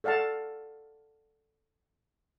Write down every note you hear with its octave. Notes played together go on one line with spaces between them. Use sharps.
A4 D5 F5 F#5 A5